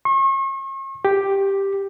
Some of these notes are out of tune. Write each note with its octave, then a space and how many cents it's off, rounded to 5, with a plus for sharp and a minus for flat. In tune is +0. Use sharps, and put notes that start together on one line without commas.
C#6 -40
G4 +5